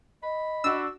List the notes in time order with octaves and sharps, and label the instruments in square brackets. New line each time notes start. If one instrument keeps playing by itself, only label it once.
[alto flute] D#5 [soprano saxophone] B5
[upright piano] D4 F#4 [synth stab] E6